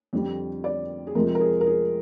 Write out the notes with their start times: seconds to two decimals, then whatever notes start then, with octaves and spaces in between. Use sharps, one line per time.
0.13 F2 D3 G3
0.64 D5
1.07 G#4
1.15 F2 C3 F3 G#3 A#4
1.35 A#4
1.41 G#4
1.61 A#4
1.66 G#4